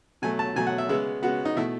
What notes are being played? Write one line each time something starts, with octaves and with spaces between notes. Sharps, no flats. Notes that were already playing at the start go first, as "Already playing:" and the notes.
B2 F#3 A3 G#5
A5
B2 F#3 A3 G#5
F#5
E5
C#3 G#3 B3 E5
C#3 G#3 B3 F#4
D#4
B2 A3 E4